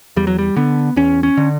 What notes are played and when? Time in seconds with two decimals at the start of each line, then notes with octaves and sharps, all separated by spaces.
0.16 E2 G3
0.27 F#3
0.39 G3
0.56 D3 B3
0.96 E2 C#4
1.23 C#4
1.37 D3